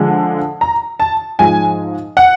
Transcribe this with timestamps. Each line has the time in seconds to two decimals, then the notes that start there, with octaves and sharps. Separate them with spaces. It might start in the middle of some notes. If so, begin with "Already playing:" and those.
Already playing: D3 F3 G#3
0.61 A#5
1.00 A5
1.39 G#2 F3 G#3 G#5
2.17 F#5